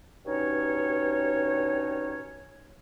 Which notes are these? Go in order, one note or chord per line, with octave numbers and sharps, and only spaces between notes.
G2 B2 C#4 D#4 C#5